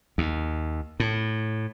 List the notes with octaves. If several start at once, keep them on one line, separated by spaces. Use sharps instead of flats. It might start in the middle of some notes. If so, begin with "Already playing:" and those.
D#2
A2